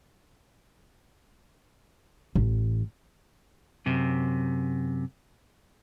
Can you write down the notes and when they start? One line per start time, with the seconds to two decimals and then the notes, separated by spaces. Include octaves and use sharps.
2.35 A1
3.86 F#2 C3